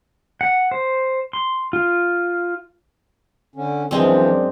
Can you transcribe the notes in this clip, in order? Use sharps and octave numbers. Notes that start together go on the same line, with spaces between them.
F#5
C5
C6
F4
D3 C#4
F#2 E3 F3 G#3 C4 D4 D5